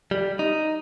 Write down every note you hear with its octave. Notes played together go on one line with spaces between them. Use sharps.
G3
D#4